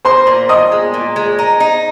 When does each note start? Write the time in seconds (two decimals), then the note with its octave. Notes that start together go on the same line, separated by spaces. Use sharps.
0.05 A#4 C5 C6
0.27 A#2
0.49 A#2 D#5 D#6
0.72 G#3
0.94 A#2
1.16 G#3
1.39 D#4
1.60 D#4